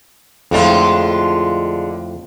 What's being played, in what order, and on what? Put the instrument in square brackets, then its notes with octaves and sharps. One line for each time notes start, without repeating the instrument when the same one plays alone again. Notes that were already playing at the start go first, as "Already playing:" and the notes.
[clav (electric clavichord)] F2 A2 [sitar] D3 G#3 F4